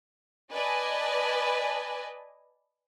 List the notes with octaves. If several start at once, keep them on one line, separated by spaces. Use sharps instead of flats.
B4 D5 D#5 G#5 A5